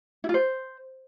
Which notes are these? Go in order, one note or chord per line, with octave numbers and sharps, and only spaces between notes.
E4
F4
C5